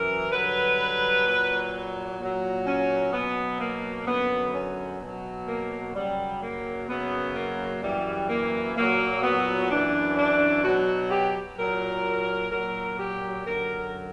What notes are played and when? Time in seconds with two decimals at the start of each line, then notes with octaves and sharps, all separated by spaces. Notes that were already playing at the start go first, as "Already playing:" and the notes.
Already playing: F#2 E3 A#4
0.31 G2 D3 F#3 B4
1.25 A#2 F#3
2.19 A#2 F#3
2.66 C#4
3.13 B2 F#3 B3
3.60 A#3
4.07 F#2 D3 F#3 B3
4.54 C#4
5.01 B2 F#3
5.47 A#3
5.94 F#2 C#3 F#3 G3
6.42 A#3
6.88 F#2 C#3 F#3 B3
7.35 A#3
7.82 F#2 E3 G3
8.29 A#3
8.76 A#2 F#3 A#3
9.23 B3
9.70 F#2 E3 D4
10.17 D4
10.63 B2 F#3 F#4
11.11 G4
11.57 A#2 F#3 A#4
12.51 A#2 F#3 A#4
12.98 G4
13.45 F#2 D3 F#3 A#4